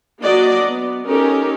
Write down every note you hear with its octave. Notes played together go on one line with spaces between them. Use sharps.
F#3 A#3 D4 F#4 D5 D#5
B3
C#4 D#4 G4 A4 A#4